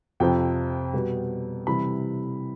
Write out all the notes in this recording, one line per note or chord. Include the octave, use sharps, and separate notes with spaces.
F2 C3 F3 C4 G5
B2 G3 B3
C3 E3 G3 B5